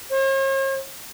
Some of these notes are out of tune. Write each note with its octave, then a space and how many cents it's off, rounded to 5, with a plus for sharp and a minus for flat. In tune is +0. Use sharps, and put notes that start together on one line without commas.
C#5 -45